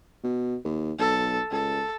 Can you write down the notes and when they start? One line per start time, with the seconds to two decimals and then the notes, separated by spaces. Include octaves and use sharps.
0.24 B2
0.65 D#2
0.99 B1 A4
1.52 C#2 A4